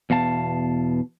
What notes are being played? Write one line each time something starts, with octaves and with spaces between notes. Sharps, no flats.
E2 B2 F5 A5